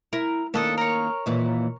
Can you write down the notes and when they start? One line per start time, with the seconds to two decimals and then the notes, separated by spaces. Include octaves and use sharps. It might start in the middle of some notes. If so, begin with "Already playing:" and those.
0.13 E4 A#4
0.54 D#3 A#3 C#4 D4 A4 D#6
0.78 A#4 C#5
1.26 D#2 A#2 E3